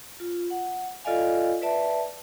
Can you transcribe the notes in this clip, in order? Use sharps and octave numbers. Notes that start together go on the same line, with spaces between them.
F4
F#5
F4 A4 D5 D#5 F5 G#5
B4 D5 E5 A5